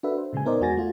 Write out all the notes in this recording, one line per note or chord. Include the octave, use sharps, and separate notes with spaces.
D4 F#4 A4 B4 E5
C5
A#2 C#3 G#3 G#5
B3 D#4 A#4 C5 D5 D#5
E2 G#3 F#4 G#5 A6 A#6
A3 F4 F#4